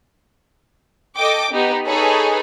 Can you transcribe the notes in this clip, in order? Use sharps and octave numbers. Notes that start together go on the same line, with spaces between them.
A4 D#5 G5 D6
B3 D#4 G4
D#4 G#4 A4 B4 C#5